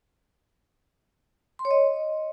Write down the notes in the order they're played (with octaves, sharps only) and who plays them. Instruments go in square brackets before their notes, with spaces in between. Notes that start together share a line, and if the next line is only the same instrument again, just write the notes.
[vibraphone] C6
C#5
D#5